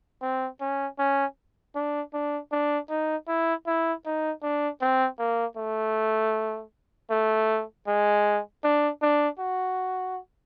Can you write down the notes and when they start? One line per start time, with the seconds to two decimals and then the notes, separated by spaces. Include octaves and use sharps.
0.22 C4
0.61 C#4
0.99 C#4
1.75 D4
2.14 D4
2.52 D4
2.89 D#4
3.28 E4
3.67 E4
4.05 D#4
4.43 D4
4.81 C4
5.19 A#3
5.57 A3
7.10 A3
7.87 G#3
8.64 D4
9.02 D4
9.39 F#4